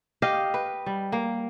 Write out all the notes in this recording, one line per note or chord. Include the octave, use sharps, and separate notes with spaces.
G4 D#5 F5
B4
G3
A#3